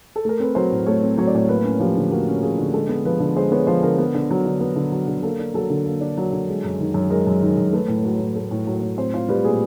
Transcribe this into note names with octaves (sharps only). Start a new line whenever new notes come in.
A4
A3 A#4
C4 B4
F#3 C5
A2
A3 C#5
C4
F#3 C#5
D5
A2 C#5
A#3 B4
C#4
F3 G4
D3
G4
A#3 F#4
C#4
F3 G#4
D3
G#3 A4
B3
F3 B4
D3
G#3 C5
B3 C#5
F3 C5
D3 A#4
B3
D3
F#3
D3
B3
D3
F#3
D3
A#3 A4
D4
F#3 A4
D3
A#3
D4
F#3
D3
G#3
F#2
D#3
F#2
G#3 A#4
F#2
D#3
F#2
A3 B4
A2
F#3 B4
A2
A3
A2
F#3
A2
C4 C5
F4 C5
G3 B4
A#2 G#4